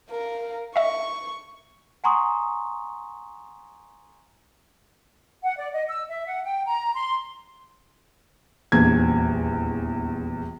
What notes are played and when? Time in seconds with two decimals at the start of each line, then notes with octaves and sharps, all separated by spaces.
0.10 A#4 F5
0.76 D#5 E5 C#6
2.04 F#5 G#5 A#5 C6 C#6 D#6
5.43 F#5
5.57 D5
5.74 D#5
5.88 E6
6.09 E5
6.26 F#5
6.45 G5
6.66 A#5
6.94 C6
8.72 D#1 A#1 E2 G#6